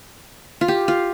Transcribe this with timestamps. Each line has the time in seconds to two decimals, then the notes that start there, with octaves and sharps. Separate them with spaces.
0.61 F4
0.68 G4
0.88 F4